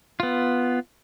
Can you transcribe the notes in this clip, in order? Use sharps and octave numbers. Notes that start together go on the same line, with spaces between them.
B3 F4